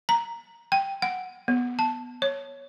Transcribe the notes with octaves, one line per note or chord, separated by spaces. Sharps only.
A#5
G5
F#5
B3
A5
C#5